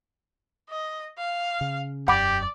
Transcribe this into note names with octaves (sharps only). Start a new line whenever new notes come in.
D#5
F5
C#3
E1 F#2 G4 D5 F#5 B5 D6